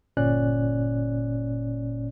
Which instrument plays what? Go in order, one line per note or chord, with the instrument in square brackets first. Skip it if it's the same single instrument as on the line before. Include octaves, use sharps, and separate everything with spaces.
[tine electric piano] G1 A#2 C#4 D5 F#6